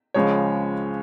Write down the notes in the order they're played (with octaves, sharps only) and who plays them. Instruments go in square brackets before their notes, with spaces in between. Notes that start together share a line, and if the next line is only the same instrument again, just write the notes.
[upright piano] C#2 C#3 F3 G#3 C#5